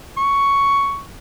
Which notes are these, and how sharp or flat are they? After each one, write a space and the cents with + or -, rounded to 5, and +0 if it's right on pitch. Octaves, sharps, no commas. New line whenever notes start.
C#6 +5